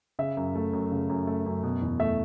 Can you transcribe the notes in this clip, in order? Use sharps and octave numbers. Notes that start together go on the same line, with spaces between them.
C#3 E5
F#2
A3
F#2
C#3
F#2
A3
F#2
B2
E2
A3 E5